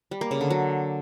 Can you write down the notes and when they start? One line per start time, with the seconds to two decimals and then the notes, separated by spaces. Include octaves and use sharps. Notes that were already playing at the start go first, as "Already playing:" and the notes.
0.11 G3
0.21 A#3
0.31 C#3
0.41 D3
0.50 F#3